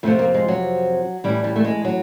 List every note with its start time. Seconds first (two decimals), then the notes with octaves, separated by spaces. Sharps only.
0.03 F2 C3 F3 A3
0.19 A#3
0.34 G#3
0.48 F#3
1.24 A2 E3 G3
1.44 G3
1.56 A3
1.65 G#3
1.85 F#3